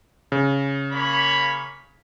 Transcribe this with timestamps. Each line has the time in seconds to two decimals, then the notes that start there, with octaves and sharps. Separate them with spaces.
0.32 C#3
0.92 A#3 C#5 B5